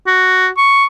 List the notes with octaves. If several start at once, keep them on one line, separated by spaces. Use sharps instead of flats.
F#4
C#6